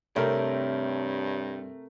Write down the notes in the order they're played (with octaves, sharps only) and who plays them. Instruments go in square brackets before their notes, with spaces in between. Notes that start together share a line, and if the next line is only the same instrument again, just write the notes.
[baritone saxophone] G2 [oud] C3 [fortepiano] A3 A#4 [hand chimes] C#5 E5